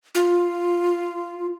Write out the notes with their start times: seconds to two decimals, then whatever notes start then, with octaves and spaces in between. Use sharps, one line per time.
0.15 F4